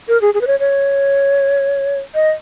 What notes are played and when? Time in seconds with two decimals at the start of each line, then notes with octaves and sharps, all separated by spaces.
0.08 A#4
0.21 G#4
0.34 G#4
0.41 B4
0.47 C#5
0.60 C#5
2.15 D#5